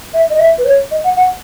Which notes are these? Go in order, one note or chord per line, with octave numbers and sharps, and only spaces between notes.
E5
D#5
E5
B4
C#5
D#5
F#5
F#5